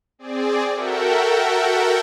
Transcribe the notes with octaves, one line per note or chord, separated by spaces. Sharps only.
C4 G#4 D5
F#4 A4 A#4 E5 F#5 G5